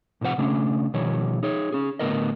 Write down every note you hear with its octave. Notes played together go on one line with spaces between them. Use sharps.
A2 C3 F3 C5 F#5
C#3 A3 C#4 D4
B2 D#3 F3 G3 C#5
D#4 G#4 C#5
C#4 G#4
A2 D3 A#3 B3 A#4 D#5